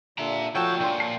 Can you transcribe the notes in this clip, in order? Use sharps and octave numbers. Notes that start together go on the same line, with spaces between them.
A#2 D3 E5 A#5
D2 F3 F#4 A4 C#5 G5 A5
A#2 D4 C6 C#6
A5 C7